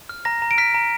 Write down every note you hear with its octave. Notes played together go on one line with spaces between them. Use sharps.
F6
A#5 A#6
A#5
D7
F6 B6
A#5